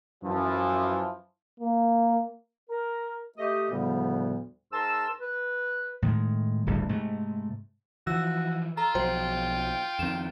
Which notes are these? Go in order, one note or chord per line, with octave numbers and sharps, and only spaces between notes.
F#2 E3 F3
A#3
A#4
A3 G4 D#5
D2 A2 C#3 F3 G3 B3
G#2 A#4 A5 C6 E6
B4
A2 D#3 E3 G#3
D1 G#1 D2 G2
G#2 C3 A3
E3 F3 F#4 E6
F4 A4 A#5
B1 F3 F#3 C5 G5
F2 D#3 C4 E7